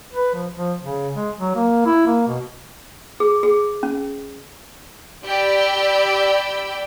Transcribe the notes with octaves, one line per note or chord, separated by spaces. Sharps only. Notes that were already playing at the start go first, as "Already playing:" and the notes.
B4
F3
F3
C#3
G#3
F#3
A#3
E4
A#3
B2
G#4
G#4
C#4
G4 D5 G5 B5 E6